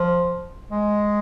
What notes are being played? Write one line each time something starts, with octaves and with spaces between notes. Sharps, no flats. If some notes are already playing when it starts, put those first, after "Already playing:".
Already playing: F3
G#3